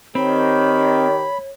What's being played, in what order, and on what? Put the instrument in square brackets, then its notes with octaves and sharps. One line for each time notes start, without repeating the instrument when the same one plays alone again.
[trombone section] D#3 G4 [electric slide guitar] C4 [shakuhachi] C#5 [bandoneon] B5